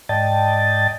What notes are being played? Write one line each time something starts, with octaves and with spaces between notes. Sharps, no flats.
G#2 D5 D#5 G5 A5 A6